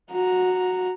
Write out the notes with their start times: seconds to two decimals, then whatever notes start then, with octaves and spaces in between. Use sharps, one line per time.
0.11 F#4 A#5